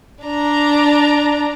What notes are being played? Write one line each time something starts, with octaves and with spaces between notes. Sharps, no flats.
D4 A#5